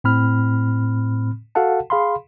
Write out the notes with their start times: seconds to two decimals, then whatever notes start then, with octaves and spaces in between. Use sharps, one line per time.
0.04 A2 C4 B5 F6
1.55 F#4 A4 F5 F#5 A5
1.90 G#4 F5 B5 C6